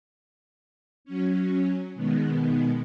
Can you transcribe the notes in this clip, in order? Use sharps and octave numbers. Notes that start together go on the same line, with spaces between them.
F#3 C#4
B2 D#3 G#3 B3